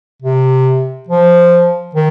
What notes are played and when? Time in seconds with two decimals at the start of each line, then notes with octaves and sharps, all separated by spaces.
0.22 C3
1.08 F3
1.95 D#3